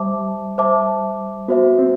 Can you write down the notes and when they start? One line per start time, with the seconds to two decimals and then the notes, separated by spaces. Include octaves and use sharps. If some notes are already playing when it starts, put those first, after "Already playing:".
Already playing: G3 C5 E5 A5 D6
0.58 C5 E5 A5 D6
1.48 B3 F#4 C5 E5
1.79 C4